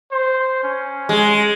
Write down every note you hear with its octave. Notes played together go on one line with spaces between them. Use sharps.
C5
C#4
G#3